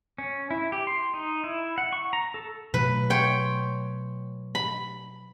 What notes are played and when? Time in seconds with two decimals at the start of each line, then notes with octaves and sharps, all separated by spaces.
0.18 C#4
0.51 E4
0.72 G4
0.87 C6
1.14 D#4
1.44 E4
1.78 F#5
1.93 C#6
2.13 A#5
2.34 A4
2.74 B2 F#3 A3 B4
3.10 C#5 G5 C6
4.55 B5